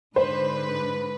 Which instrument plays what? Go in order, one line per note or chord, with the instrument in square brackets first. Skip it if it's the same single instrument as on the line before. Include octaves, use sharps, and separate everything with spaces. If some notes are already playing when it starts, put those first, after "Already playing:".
[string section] G#2 D3 B4 [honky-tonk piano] C5